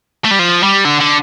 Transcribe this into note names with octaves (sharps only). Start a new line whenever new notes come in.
A3
G3
F3
G3
D3
D3